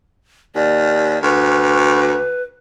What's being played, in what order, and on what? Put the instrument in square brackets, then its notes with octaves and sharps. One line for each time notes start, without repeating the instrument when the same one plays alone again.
[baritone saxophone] D#2 [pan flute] D5
[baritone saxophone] D2 [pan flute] B4